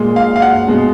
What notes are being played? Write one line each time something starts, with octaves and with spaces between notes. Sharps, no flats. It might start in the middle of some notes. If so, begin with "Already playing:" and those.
Already playing: A#2 G#3
F5
F5
F#5
B2 G#3